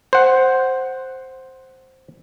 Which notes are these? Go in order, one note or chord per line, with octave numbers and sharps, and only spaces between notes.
C5 F#5